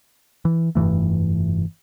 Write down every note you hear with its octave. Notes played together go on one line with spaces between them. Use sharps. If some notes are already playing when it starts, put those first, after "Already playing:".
E3
F1 G2 E3 A3